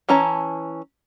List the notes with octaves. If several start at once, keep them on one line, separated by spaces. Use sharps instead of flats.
E3 C#4 A5 A#5